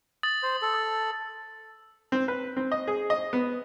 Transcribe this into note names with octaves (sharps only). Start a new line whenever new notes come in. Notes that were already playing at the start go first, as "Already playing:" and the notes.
D#6 A6 F#7
C5
A4
D#6
C4
B4
C4
D#5
G#4
D#5
B3